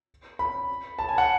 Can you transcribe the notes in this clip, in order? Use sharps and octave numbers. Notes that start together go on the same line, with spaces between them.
B5
A5
G#5
F#5